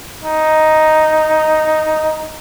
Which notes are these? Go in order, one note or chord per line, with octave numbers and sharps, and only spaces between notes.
D#4